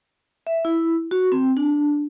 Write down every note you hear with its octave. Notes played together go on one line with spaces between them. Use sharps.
E5
E4
F#4
C4
D4